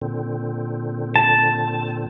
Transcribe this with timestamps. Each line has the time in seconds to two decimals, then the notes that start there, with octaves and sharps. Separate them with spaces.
0.02 A#2 D3 C4
1.16 A5